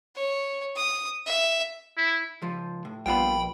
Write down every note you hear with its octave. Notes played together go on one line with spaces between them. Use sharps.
C#5
D#6
E5
E4
C#2 F3
A2
A#1 G3 B3 F4 G5 B5